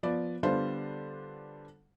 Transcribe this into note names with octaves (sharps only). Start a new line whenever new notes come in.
F3 B3 D5
D3 G3 B3 D4 F4 C5